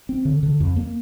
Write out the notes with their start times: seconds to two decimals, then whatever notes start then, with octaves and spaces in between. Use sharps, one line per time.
0.09 C4
0.25 D3
0.43 D3
0.60 F2
0.76 A#3